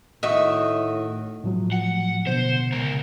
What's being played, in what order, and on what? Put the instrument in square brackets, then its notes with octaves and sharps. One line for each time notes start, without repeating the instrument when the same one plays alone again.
[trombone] A2 [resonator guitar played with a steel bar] D#3 F#4 D#5 [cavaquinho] E5 C#6
[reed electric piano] A2 F3 F#3
[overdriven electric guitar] F#5
[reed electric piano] B2 D3 [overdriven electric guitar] C5
[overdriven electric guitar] C#2 A#4